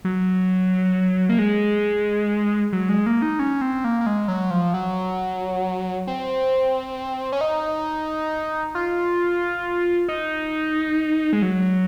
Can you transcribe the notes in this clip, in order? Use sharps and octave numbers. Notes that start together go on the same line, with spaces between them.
F#3
A#3
G#3
F#3
G#3
A#3
D#4
C#4
C4
A#3
A#3
G#3
F#3
F3
F#3
C4
C#4
D#4
F4
D#4
G#3
F#3